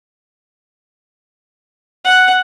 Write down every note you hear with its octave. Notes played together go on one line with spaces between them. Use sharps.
F#5